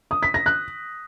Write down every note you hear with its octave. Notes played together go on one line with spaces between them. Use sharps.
D#6
B6
A#6
F#6